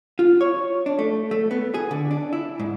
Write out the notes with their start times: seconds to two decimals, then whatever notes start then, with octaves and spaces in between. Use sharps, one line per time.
0.19 F4
0.41 C#5
0.86 D4
0.99 A3
1.31 A3
1.51 B3
1.74 G#4
1.91 D3
2.11 D4
2.33 E4
2.60 G#2